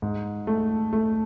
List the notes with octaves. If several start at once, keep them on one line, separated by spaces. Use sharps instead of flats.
G#2
A3
A3